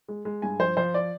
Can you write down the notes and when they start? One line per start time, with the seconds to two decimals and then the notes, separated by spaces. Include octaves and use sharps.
0.08 G#3
0.25 G#3
0.42 G2 G#5
0.59 F3 C5
0.77 F3 C5
0.94 D5